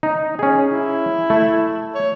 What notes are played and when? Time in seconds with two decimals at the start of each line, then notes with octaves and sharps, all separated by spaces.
0.03 D#4
0.39 C#4 G#4
0.72 E4
1.30 A3
1.95 C#5